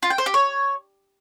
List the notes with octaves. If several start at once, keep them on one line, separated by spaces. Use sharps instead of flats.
F4
G5
C5
G4
C#5